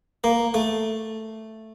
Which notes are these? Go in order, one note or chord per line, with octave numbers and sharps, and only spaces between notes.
A#3
A3